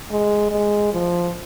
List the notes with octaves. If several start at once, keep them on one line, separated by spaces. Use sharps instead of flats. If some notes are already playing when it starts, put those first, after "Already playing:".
G#3
G#3
F3